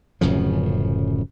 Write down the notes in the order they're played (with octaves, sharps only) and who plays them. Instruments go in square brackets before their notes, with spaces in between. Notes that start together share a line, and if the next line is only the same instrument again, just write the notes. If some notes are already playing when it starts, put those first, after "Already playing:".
[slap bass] D1 F#2 C#3 F3